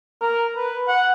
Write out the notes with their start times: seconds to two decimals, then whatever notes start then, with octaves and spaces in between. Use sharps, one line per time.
0.21 A#4
0.56 B4
0.88 F#5